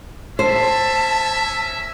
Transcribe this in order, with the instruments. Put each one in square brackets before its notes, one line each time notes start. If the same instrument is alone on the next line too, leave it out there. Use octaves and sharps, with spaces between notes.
[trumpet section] C#4 E5 [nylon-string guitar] C5 [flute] A5